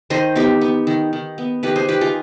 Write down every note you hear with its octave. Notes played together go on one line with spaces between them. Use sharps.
D#3 C5 D#5
B3 D#4 G4
B3
D#3
D#3
B3
D#3 G4 B4
G#4 C5
D#3 G4 B4
F4 G#4